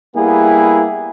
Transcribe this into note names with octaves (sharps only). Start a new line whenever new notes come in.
G3 A#3 B3 E4 G#4